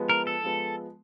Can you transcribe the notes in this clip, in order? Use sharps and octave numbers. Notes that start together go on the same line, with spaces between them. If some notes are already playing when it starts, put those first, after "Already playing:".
Already playing: F3 G#3 B3
A#4
A4
F3 G#3 B3